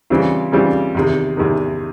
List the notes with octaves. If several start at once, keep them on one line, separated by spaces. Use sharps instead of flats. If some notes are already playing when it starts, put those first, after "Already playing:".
C#3 E3 G3 C4 F4
C#3 E3 G3 C4 F4
E2 C3 D#3
E2 C3 D#3